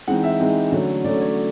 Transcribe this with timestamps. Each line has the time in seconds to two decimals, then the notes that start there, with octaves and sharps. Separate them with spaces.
0.07 E3 G#3 C4 D#4 F#5
0.24 E5
0.40 E3 G#3 C4 D#4
0.72 D3 F#3 A3 C#4
1.04 D3 F#3 A3 C#4 D5
1.21 C#5